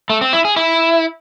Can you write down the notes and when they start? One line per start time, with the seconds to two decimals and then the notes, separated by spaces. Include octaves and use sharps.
0.10 A3
0.21 C4
0.33 E4
0.45 G#4
0.56 E4